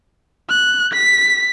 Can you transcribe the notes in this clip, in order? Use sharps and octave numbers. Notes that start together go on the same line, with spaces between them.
F#6
B6